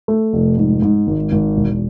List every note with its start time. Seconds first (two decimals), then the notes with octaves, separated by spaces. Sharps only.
0.08 A3
0.33 F1
0.58 G#2
0.82 G#2
1.07 G#1
1.32 G#1
1.57 E1